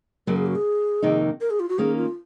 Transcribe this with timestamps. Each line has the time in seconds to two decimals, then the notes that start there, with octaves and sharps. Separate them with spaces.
0.27 F#2 C#3 F#3 A#3 A#4
0.36 G#4
0.46 F#4
0.56 G#4
1.02 F2 C3 D#3 A#3 D#4
1.41 A#4
1.50 G#4
1.60 F4
1.69 F#4
1.78 D#3 A#3 C#4 G#4
1.97 F4